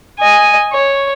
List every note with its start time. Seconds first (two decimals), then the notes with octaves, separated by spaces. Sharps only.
0.19 D#5 G#5
0.72 C#5